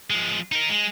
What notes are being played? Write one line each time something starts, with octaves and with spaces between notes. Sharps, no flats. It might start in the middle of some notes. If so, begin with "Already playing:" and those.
F3 G#3
D#4 A#4
G#3